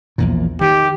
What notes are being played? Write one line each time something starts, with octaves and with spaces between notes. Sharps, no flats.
A#1 E2 A#2
D#3 G4